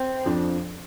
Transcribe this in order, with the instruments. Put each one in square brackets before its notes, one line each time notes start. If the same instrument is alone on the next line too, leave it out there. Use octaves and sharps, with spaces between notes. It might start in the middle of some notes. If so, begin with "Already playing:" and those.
Already playing: [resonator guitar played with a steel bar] C4
[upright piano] F2 F3 D4